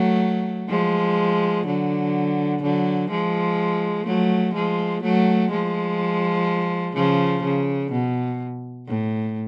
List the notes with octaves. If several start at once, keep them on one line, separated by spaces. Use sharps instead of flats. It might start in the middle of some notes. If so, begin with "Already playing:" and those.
Already playing: F#3 A3
F3 G#3
D3 F#3
D3 F#3
F3 G#3
F#3 A3
F3 G#3
F#3 A3
F3 G#3
C#3 F3
C#3
B2
A2